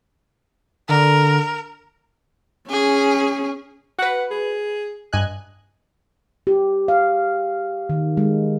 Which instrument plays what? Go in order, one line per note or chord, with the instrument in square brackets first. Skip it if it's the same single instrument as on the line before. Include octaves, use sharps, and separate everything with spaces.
[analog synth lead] D3 [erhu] A#4
[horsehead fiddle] C#4 [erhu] G#4
[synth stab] F#4 B4 [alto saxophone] F#5
[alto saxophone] G#4
[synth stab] G2 G#5 F#6 [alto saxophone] D#5
[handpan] G4
F5
D#3
G#3